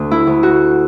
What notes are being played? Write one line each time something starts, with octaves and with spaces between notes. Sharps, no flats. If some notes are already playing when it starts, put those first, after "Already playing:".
Already playing: D2
E4
D2
F#4